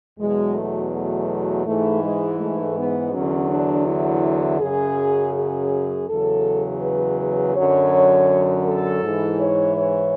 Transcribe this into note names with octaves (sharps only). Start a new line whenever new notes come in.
E2 B2 F#3 G#3
A3
A3
G#2 E3 A3
G#3
A3
B3
E2 D3 F#3 C#4
D4
E4
F#2 C#3 F#3 G#4
G#4
E2 C#3 F#3 A4
B4
B4
F#2 D3 F#3 C#5
A4
G#2 E3
C#5
C#5